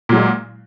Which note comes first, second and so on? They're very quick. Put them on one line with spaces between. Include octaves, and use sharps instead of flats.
A#2 F#3 G#3